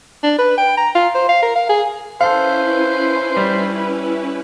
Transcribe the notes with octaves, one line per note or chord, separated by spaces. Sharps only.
D4
B4
G5
A#5
F4
C5
F5
A#4
F5
G#4
C#4 E4 A4 B4 C5 F5
G3